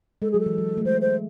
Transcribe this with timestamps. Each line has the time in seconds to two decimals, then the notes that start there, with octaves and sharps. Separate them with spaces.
0.22 G#3 A4
0.31 F#3 G#4
0.40 A4
0.46 E3
0.58 F#3
0.77 A3
0.85 G#3 C5
1.01 C5